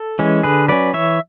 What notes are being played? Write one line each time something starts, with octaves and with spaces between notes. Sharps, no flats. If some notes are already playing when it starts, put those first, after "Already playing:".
Already playing: A4
E3 G#3 C#4
D3 G#4 B4
F#3 C#4 B4 D5
E3 C#5 E5